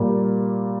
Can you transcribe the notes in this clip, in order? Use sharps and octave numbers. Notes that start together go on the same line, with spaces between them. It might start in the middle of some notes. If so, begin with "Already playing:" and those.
Already playing: A#2 G3 A#3